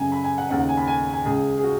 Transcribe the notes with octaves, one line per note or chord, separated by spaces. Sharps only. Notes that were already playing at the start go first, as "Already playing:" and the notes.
Already playing: F#2 C#3 G#5
B5
G#5
F#5
D#2 C#3 F#5
F#5
G#5
B5
G#5
G#5
C#2 C#3 G#4
G#4
F#4